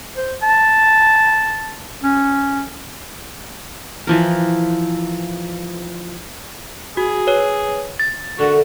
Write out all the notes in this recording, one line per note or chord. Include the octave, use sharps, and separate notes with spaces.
C5
A5
C#4
E3 F3 A#4
F#4 G#4
B4 C#5
A6
D3 A3 F#4 A#4